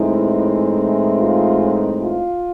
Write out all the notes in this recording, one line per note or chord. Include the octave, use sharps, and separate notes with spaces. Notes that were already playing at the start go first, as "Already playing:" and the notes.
Already playing: A2 E3 G#3 C4 D#4 E4
F4
F4